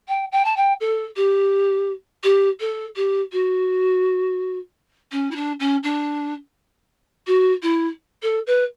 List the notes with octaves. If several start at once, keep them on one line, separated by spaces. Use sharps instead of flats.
G5
G5
A5
G5
A4
G4
G4
A4
G4
F#4
C#4
E4
D4
C#4
D4
F#4
E4
A4
B4